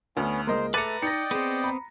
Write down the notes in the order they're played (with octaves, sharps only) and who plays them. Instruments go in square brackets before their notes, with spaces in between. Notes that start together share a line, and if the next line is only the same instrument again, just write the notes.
[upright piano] D2 [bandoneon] B3 C#4 [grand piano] F6
[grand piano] C#2 A#3 [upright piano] A#4 D#5 [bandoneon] C5
[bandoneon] A3 [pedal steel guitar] B4 A#5 [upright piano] D6 A6 D#7 [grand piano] F#6 C#7
[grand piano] D#4 [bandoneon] D5 D#5 G5 [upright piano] A#6 C#7
[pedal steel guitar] B3 C4 [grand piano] G#4
[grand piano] A#5 B5